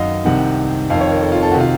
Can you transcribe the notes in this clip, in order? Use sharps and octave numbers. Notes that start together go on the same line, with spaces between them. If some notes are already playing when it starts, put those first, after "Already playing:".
Already playing: F#2 D#3 D#5 F5 F#5
C2 C3 D#3 F#5
F2 D#3 F5
C#5
A#4
A4
F4
A4
C3 D#3 F#4
F4